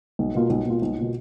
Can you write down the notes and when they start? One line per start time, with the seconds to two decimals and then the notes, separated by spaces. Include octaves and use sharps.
0.19 B1
0.35 B2 A#3 F4
0.50 B1
0.66 B2 A#3 F4
0.82 B1
0.97 B2 A#3 F4